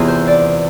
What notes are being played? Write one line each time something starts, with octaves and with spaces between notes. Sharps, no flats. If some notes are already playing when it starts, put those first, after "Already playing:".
Already playing: E2 C3 E3 F4 G#4
C5
D5